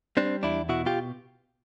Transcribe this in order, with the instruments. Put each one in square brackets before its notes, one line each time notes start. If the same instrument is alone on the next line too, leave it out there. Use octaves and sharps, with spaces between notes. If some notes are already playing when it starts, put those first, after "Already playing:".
[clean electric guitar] G3 C4 D4
E2 D4 E4
B2 E4 F#4
F4 G4